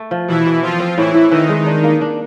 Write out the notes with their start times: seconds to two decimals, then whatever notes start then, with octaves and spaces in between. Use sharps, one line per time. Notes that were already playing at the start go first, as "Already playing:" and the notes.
Already playing: A3
0.11 F3
0.28 B2 E3 E4
0.46 B2
0.63 F3 C4 F4
0.80 C4
0.97 A2 E3 E4
1.14 A2
1.31 D#3 E3 D#4
1.49 G#3
1.66 D4
1.84 A#3
2.01 D4